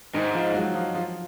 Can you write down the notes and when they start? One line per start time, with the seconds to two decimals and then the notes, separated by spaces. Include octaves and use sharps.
0.14 G#2 D#3 D#4
0.34 F3 F4
0.55 F#3 F#4
0.75 F3 F4
0.95 F3 F4